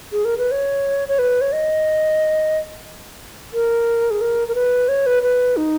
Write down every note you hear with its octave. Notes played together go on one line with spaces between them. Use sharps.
G#4
A#4
B4
C#5
C#5
B4
C#5
D#5
A#4
G#4
A#4
A#4
B4
C#5
B4
B4
D#4